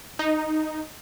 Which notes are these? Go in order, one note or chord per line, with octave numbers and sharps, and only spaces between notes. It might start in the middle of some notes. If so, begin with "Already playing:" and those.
D#4